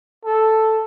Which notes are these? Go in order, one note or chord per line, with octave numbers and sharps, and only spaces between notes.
A4